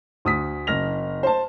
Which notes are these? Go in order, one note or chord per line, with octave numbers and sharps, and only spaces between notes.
D2 D#6 B6
F#1 F6 A#6 F7
C5 A5